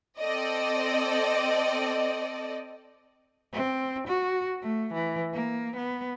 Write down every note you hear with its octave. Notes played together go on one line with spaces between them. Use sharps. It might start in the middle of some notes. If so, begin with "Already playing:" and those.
C4 A4 D5 D#5
C4
F#4
A3
E3
A#3
B3